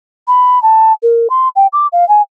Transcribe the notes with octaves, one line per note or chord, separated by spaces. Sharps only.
B5
A5
A#4
C6
G5
D6
F5
G#5